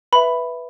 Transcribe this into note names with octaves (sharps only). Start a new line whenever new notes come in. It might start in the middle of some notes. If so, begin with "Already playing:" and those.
B4 E5 B5